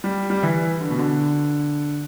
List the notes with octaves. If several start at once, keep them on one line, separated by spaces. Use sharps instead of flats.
G3
G3
E3
D3
B2
D3